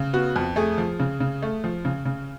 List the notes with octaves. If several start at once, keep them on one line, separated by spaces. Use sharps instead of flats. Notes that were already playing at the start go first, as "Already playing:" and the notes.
Already playing: C#3
B3 F#4
F2
A3 G#4
F3
C#3
C#3
A3
F3
C#3
C#3